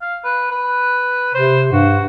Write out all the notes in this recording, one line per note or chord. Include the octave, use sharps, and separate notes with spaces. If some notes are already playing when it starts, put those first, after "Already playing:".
F5
B4
B4
C3 C5
G2 F#4